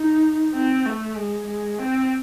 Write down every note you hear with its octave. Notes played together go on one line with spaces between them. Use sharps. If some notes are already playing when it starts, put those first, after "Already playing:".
Already playing: D#4
C4
A3
G#3
G#3
C4